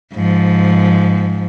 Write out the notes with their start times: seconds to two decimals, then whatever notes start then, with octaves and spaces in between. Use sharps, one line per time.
0.15 G#2 F3